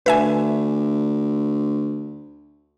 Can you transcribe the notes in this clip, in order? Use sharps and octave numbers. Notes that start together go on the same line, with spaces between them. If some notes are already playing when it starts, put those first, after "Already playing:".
D2 B4 E5 G#5